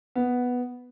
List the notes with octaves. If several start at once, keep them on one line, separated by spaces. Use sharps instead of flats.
B3